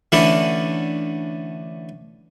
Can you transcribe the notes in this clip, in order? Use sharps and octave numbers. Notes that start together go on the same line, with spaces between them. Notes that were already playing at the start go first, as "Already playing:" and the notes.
D3 E3 A3 C#4 D4 E4